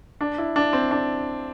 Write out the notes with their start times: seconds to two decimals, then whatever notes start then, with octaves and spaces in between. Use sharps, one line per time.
0.21 D4
0.38 E4
0.56 D4
0.73 C4
0.91 D4